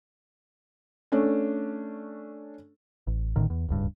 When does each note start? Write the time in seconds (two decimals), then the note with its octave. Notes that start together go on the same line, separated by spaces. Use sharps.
1.12 A3 C#4 D4
3.07 A1
3.36 A1 A2 D3 D#3
3.50 E2
3.69 D1 C#2 G2